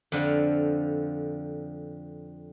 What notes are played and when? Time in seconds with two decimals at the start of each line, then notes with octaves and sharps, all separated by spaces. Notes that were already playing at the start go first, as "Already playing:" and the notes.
0.12 F2 D3 F3